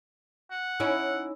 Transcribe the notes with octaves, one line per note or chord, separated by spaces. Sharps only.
F#5
C#4 D#4 E4